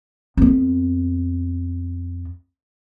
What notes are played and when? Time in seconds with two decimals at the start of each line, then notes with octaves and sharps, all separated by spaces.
0.37 F2 B3